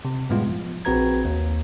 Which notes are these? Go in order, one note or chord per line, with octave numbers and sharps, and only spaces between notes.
C3
F#2 A2 G3 G#3 B3 F4
F3
A#1 C4 F#4 B4 A#5 G#6
D#2